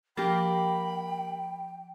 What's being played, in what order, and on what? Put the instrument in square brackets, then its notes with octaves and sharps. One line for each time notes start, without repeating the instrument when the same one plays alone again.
[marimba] F3 [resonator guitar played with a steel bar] A#3 G4 [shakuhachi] G5 [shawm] B5